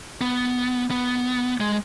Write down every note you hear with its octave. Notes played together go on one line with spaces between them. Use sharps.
B3
B3
G#3